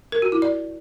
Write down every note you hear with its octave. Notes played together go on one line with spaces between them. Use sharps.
A#4
F#4
E4
D5